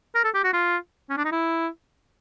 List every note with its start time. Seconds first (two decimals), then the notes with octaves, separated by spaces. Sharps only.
0.15 A#4
0.24 A4
0.34 G4
0.44 F#4
0.53 F4
1.10 C#4
1.17 D4
1.25 D#4
1.32 E4